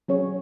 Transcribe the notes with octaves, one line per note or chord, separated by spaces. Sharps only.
F#3 C#4 G#4 C#5